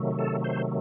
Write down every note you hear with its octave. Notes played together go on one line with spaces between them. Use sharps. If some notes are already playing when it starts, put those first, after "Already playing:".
Already playing: C3 D#3 F#3 A3
A4
C5